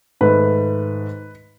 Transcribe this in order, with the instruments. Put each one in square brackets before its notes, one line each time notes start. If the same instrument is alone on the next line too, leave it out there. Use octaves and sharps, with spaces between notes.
[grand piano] G#2 D#3 A3 B4